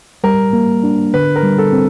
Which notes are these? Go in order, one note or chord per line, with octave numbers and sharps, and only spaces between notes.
G3 A#4
A#3
D4
D3 B4
A#4
G3
A4
C4